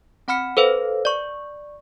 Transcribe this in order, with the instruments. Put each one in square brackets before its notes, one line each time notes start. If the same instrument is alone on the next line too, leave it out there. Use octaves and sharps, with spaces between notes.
[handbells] C4 F#5 B5 F6 C#7
A4 B4 C5 F5
D5 C#6